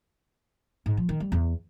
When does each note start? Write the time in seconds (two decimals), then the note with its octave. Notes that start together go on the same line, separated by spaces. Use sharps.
0.86 G#2
0.97 F3
1.09 D#3
1.20 G3
1.32 E2